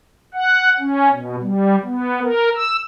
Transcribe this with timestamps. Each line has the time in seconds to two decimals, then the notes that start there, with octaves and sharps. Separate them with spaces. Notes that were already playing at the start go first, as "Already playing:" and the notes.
0.34 F#5
0.79 C#4
1.12 B2
1.41 G3
1.84 B3
2.23 A#4
2.56 E6